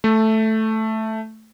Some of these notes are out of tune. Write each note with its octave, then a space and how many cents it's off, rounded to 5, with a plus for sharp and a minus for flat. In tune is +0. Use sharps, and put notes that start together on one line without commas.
A3 +0